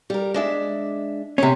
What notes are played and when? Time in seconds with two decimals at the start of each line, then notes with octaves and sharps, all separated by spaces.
0.10 G3 A#4
0.34 G#3 D4 E5
1.38 C3 C#4